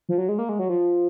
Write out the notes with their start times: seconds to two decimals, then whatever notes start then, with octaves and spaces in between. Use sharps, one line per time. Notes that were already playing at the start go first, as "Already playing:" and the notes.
0.09 F3
0.18 F#3
0.29 G#3
0.39 A#3
0.49 G#3
0.59 F#3
0.69 F3